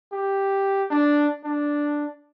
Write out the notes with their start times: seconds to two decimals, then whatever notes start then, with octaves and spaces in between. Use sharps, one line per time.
0.13 G4
0.91 D4
1.44 D4